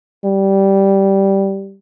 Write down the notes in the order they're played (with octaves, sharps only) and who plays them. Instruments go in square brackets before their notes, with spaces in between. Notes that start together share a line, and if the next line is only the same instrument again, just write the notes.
[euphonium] G3